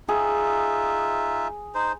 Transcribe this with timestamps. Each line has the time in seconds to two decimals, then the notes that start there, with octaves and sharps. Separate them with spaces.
0.08 D#4 F4 G#4 E5
1.75 D#4 C5